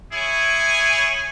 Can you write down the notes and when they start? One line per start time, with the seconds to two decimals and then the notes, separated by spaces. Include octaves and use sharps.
0.13 E4 G#4 C#5 G#5